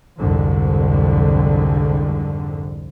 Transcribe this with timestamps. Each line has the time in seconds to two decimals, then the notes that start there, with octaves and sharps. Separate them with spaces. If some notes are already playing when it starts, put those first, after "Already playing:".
0.18 C2 F2 G#2 D3